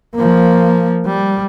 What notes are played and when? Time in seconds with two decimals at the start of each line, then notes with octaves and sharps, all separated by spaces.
0.16 F3 A#3
1.06 G3